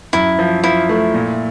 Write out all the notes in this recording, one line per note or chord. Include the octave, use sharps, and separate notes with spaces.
F#2 E4
F3
F3 E4
A3
A#2